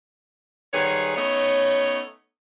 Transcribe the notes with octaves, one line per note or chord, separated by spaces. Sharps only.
G#2 D#3 G3 G#4 B4 C#5
A3 B3 C#4 D#4 C#5